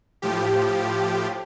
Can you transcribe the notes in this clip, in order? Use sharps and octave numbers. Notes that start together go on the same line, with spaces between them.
A2 F3 G4